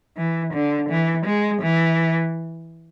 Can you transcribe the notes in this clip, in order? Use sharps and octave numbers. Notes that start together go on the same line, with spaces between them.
E3
D3
E3
G#3
E3